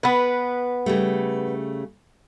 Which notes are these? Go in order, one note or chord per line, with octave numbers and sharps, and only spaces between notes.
B3 B4
C#3 G3 A3